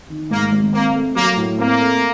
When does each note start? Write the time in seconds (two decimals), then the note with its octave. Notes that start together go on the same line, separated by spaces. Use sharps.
0.10 D#3
0.30 G#2 A#3
0.52 G#1
0.73 A#3 C4
0.94 A3
1.16 F#3 A#3
1.36 A2
1.58 A#3 C4
1.80 A3